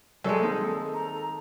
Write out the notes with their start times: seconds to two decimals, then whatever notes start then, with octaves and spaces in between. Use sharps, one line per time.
0.24 F#2 D#3 G3 G#3 C#4 A4
0.41 A#3 C4 D#4
0.94 A#5